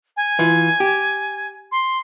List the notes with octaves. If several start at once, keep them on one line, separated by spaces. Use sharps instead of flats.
G#5
E3 F4
G4
C6